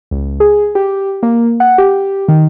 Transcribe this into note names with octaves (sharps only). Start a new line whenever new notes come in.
C#2
G#4
G4
A#3
F#5
G4
D#3